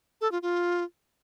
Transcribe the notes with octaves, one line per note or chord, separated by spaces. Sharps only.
A4
F4
F4